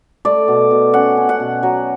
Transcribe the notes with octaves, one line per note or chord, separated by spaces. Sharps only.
A3 D5
B2
B2
C#4 F#5
C#4
F#5
B2
F#3